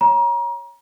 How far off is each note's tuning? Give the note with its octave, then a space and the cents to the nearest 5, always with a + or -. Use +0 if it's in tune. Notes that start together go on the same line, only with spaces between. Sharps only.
C#5 +0 A#5 +30